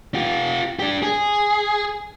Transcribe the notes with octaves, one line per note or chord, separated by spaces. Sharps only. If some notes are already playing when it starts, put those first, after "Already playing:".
F4 G4
D4 G4
G#4